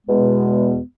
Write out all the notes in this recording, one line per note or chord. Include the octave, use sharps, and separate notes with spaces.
E2 B2 G#3 B3